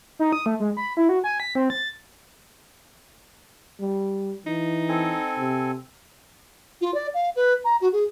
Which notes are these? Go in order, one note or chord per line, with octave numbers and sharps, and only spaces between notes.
D#4
D#6
A3
G#3
B5
E4
F#4
G#5
B6
C4
A6
G3
E3 D#4
C4 A4 G#5
C3
F4
D5
F5
B4
A#5
F#4
G#4